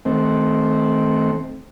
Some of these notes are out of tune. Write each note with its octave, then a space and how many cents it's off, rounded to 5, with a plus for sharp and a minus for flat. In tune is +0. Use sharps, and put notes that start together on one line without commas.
D#3 +10 A3 -20 C4 +0